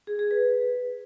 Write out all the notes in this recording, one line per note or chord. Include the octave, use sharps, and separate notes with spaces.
G#4
G#4
B4